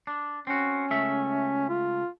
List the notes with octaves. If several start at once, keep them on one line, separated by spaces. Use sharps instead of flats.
D4
C4 C#4 F#4
C#2 A3 E5
F4